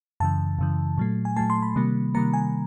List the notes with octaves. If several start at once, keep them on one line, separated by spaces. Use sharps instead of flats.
F#2 C#3 E3 A5
F#2 C#3 E3
A#2 F#3 A3
G#5
A#2 F#3 A3 A5
C6
B5
C3 D#3 G3 A#3
C3 D#3 G3 A#3 A#5
G#5